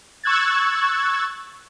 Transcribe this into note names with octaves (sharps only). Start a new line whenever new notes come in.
C#6 E6 F#6 G#6 A6